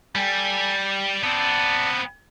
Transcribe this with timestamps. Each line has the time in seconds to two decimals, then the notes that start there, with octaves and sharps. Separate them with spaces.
0.15 G3 A4 G5 G#5
0.88 G4
1.23 B3 C4 D5 A5